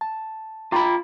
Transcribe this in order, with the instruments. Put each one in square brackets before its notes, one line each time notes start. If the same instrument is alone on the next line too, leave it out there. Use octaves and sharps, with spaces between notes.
[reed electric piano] A5
[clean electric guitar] F4 B5 [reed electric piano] G5 A#5 D6